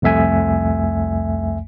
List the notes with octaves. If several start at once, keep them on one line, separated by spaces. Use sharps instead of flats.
C2 F2 A3 E5 G#5